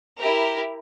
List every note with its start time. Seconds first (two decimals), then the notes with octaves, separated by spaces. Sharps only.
0.18 E4 G4 A#4